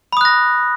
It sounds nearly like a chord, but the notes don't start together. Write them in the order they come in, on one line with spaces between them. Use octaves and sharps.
B5 D#6 F#6 A#6